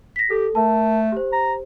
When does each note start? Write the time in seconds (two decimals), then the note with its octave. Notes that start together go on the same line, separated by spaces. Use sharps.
0.16 A#6 B6
0.30 G4 A4
0.55 A3 A#4 A5
1.12 G4 C5
1.32 A#5